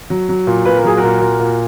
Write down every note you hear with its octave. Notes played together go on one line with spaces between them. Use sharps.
F#3
F#3
A#2
A#2 B4
A#4
F#3 G#4
F#4 A#4
A#2
A#2
A#2